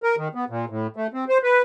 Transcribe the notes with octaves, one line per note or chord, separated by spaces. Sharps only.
A#4
D#3
B3
A#2
A2
A3
C4
C5
B4